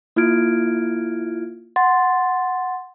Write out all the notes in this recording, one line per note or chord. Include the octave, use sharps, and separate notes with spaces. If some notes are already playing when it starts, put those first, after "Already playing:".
A#3 E4 F4 F6 G#6 D7
F#5 C6 A6